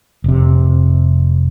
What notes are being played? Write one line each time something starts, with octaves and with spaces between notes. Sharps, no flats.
F1 C3